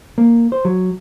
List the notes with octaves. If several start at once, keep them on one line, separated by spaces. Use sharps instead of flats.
A#3
C5
F#3